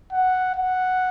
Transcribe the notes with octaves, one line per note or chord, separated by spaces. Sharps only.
F#5
F#5